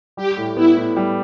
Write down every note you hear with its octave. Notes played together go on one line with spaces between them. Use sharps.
G3 G4
A2
B3 E4
A2
G3